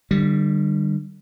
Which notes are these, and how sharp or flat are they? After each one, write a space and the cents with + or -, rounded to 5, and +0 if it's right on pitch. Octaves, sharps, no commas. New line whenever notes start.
D3 +35 G3 +0